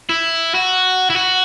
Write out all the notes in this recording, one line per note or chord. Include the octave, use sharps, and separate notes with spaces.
E4
F#4
E4
F#4